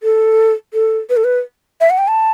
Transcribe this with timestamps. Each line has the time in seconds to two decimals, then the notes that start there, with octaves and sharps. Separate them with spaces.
0.03 A4
0.73 A4
1.10 B4
1.17 A4
1.24 B4
1.81 E5
1.90 F#5
1.98 G5
2.08 A5